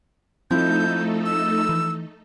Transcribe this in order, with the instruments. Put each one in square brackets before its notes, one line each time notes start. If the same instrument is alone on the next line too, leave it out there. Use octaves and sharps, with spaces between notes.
[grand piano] F3 E4 [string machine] A3 D#4 A4 [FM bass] C4 [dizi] G6
[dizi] E6
[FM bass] E3